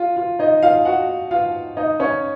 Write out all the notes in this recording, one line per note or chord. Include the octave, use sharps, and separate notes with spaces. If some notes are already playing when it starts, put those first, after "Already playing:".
Already playing: F4
F4
D#4 D#5
F4 F5
F#4 F#5
F4 F5
D#4 D#5
C#4 C#5